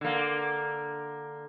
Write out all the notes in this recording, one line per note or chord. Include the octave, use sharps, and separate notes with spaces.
D3 A#3